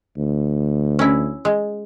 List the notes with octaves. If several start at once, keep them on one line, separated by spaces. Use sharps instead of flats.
D2
C#4 E4
G#3